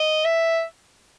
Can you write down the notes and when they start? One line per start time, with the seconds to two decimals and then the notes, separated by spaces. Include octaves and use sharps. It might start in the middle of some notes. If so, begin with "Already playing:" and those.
Already playing: D#5
0.25 E5